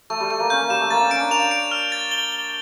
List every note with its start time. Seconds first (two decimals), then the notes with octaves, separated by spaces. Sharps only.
0.10 A3 C#6
0.20 G3
0.30 A3 C#6
0.40 A#3
0.50 C#4 G6
0.60 A#3
0.70 G3 E7
0.81 A3
0.91 A#3 A6
1.01 C#4
1.11 C#4 D7
1.21 D4
1.31 A#3 F7
1.51 D7
1.71 F6
1.92 A6
2.11 G7
2.32 G7